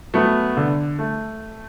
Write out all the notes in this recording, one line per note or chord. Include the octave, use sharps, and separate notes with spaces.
F#3 A3 B3
D3
A3